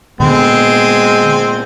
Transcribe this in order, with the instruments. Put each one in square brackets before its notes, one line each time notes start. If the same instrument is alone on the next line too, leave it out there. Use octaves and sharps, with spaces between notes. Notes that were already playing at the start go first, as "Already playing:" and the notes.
[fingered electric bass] A#2 B3 [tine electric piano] D3 [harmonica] G#3 C4